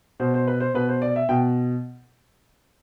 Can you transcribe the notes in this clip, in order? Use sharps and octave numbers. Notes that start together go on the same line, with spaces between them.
B2 C5
C5
B4
C5
B2 B4
C5
D5
E5
B2 G5